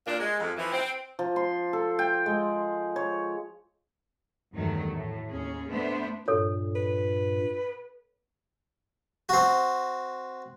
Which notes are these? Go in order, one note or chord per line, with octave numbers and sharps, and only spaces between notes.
A#2 D4
G#3
F2
E3 F3
C4
F3
C6
A4
G5
G#3
C#5
E2 G2 D#3 F#3 A3
A2
D#2 C#4 G#4
A3 B3 D4 C5 E5
G2 A#2 A4 C#5
B4
C4 F#4